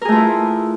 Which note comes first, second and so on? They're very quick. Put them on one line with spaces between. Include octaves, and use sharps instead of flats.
A#4 G#4 A3 F4 E4